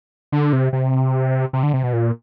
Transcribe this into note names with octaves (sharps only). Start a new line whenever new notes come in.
D3
C3
C3
C3
D3
C3
B2
A#2